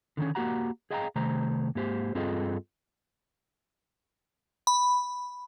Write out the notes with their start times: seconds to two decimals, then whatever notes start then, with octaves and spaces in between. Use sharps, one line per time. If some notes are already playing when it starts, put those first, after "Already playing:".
0.17 D3 D#3 B3 C#4
0.35 A#3 F#4 G4 F#5 A#5
0.91 G#4 D#5 F5 G5 A5 A#5
1.16 C3 D#3 A3 C5 A#5
1.75 G#2 A#3 G4 C5
2.15 G2 C4 F4 G#4 A4 D#5
4.67 B5